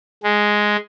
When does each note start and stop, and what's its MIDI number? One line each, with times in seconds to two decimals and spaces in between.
0.23 0.77 56